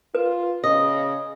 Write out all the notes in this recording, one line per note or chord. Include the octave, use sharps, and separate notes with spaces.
F4 B4
C#3 D#5